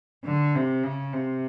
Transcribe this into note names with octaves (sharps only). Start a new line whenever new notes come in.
D3
C3
C#3
C3